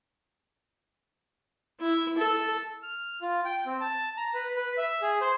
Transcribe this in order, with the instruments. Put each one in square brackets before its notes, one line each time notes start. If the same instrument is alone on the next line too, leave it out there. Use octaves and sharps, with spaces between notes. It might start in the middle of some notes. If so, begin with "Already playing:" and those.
[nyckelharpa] E4
A4
[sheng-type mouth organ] F6
F4
G5
C4
A5
A#5
B4
B4
E5
G#4
C5